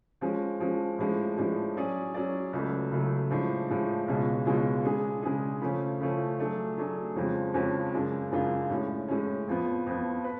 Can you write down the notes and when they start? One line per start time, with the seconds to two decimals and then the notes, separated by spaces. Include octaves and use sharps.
0.21 F3 G#3 C#4
0.60 F3 G#3 C#4
0.98 A2 F3 G#3 D4
1.38 A2 F3 G#3 D4
1.76 F#3 C#4 G#4 D5
2.14 F#3 C#4 G#4 D5
2.53 C#2 C#3 F#3 A3
2.91 C#2 C#3 F#3 A3
3.30 A2 F3 G#3 D4
3.68 A2 F3 G#3 D4
4.08 C#2 B2 G#3 C#4 F4
4.45 C#2 B2 G#3 C#4 F4
4.85 C#3 G#3 D4 G#4
5.23 C#3 G#3 D4 G#4
5.61 C#3 F3 A3 C#4
6.00 C#3 F3 A3 C#4
6.39 F#3 A3 D4 G#4
6.77 F#3 A3 D4 G#4
7.16 F2 C#3 F3 G#3 C#4
7.54 F2 C#3 F3 G#3 C#4
7.94 F#2 C#3 G#3 D4 F4
8.32 F#2 C#3 G#3 D4 F4
8.70 A2 G#3 C#4
9.08 A2 G#3 C#4
9.47 F2 F3 B3
9.86 F2 F3 B3
10.24 B4